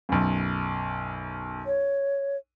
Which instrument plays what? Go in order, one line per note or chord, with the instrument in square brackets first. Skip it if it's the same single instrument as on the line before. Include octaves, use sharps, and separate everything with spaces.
[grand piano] B1 F#2
[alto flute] C#5